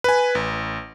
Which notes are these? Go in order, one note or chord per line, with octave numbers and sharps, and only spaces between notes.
B4 G#5
A1